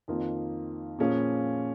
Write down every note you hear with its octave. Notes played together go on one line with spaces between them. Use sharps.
F2 D#3 A#3 F4
A#2 F3 A#3 C#4 G#4